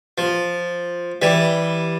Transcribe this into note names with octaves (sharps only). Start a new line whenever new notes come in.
F3
E3 G3